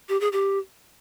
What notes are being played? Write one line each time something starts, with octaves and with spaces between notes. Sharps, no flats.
G4
G#4
G4